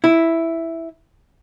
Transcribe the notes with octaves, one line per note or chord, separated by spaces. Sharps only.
E4